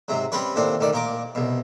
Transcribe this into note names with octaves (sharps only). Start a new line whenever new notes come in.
G#2 C3 F#3
G3 C4 C#4 B4 C#5
D#2 A2 C4 D4
D2 D#3 D5
A#2 A#4 D6
C2 B2